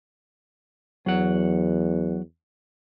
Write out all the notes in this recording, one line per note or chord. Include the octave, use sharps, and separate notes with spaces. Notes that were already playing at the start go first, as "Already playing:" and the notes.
E2 F#3 F#5